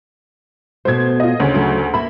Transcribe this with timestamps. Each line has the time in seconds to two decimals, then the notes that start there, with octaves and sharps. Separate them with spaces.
0.85 B2 A3 C5 G#6
1.20 F4 D#5
1.40 D2 C#3 C#4
1.54 F#3 A3
1.94 A#3 A#4 E5 B5